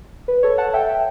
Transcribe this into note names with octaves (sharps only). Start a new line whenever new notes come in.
B4
A4 C#5
F#5 A5
E5 G5